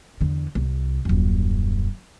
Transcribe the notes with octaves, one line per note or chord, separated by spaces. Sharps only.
E2 D3
C2
D#1 F#2